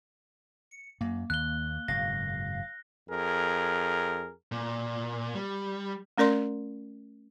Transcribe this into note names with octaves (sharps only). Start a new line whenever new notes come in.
C#7
F#2 A#3
D#2 F#6 G7
F#1 G#2 B2 F5 A#6
F2 G#4 A#4
A#2
G3
A3 C#4 A#4 D5 C6